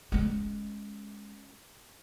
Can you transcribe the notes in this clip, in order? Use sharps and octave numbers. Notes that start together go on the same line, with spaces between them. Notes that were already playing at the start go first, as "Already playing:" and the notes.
G#3 C#4